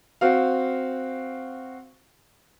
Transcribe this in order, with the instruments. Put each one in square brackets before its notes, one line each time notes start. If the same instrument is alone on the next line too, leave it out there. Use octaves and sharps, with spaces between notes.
[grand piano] C4 F#4 F5